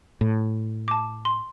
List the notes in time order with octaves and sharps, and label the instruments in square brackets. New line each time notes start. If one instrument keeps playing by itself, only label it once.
[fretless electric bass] A2
[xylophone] A5 D6
C6